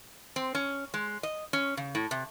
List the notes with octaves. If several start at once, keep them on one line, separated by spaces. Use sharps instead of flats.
C4
C#4
G#3
D#5
C#4
C#3
A2
C3